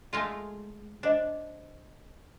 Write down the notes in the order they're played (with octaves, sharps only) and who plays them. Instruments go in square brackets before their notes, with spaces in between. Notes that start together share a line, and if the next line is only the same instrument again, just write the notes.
[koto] G#3 A3 F4
[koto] D4 [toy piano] C5 D#5